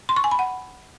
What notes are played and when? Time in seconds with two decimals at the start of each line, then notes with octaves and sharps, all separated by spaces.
0.09 C6
0.16 C#6
0.24 G#5
0.31 B5
0.39 F#5